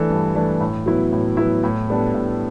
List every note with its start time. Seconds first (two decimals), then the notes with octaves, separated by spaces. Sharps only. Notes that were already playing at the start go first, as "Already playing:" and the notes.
Already playing: E3 A3 D4 A4
0.10 G2
0.35 E3 A3 D4 A4
0.61 A2
0.86 F#3 B3 E4
1.13 A2
1.37 F#3 B3 E4
1.64 A2
1.89 G3 B3 D4 A4
2.14 A2